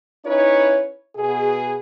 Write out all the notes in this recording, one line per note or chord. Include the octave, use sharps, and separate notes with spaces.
C#4 D#4 E4 B4 C#5
B2 G#4